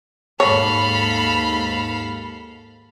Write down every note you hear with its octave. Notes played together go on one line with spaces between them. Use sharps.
D#2 G#2 A4 C#5 F5 B5